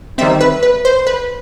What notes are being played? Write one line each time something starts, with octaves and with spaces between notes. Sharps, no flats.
D#3 G3 C4 E5
B4
B4
C5
B4